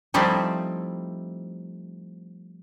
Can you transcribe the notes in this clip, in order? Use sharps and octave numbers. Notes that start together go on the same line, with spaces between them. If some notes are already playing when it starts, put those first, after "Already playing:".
F3 G3 A3 C4 D#4 E4